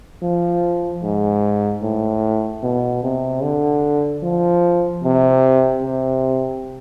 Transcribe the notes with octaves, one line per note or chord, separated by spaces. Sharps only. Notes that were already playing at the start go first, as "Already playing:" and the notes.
F3
G#2
A2
B2
C3
D3
F3
C3
C3